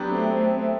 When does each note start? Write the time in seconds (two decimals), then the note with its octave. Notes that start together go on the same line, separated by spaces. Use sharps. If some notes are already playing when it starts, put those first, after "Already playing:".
Already playing: F#3 B3 D4 G4
0.09 A3 C4
0.31 A3 C4
0.52 A3 C4